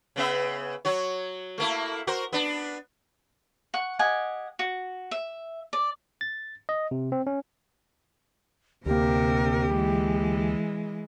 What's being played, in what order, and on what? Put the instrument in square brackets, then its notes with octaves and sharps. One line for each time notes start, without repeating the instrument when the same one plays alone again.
[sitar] C#3 B3 E5
F#3 F#4 C#5
A3 A#3 E4
F#4 A#4 C5
B3 D4
[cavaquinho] F#5 C#6
G4 D#5 F#5 G#5
F#4
E5
D5
[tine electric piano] A6
D#5
C3
C4
C#4
[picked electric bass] D2 A#3 [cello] C3 A#4 [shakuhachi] G4
[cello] E3 G#3